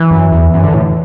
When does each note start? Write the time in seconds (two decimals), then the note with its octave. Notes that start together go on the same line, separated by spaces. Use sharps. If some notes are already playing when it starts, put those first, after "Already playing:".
Already playing: E3
0.11 F#2
0.32 E2
0.54 F#2
0.64 D3
0.74 A2